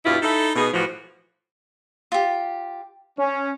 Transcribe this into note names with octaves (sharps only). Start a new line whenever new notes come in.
G2 B2 E4 F4
D#4 E4 A4
B2 B3 D#4 G#4
A2 E3 F3 F#4
F4 G4
C#4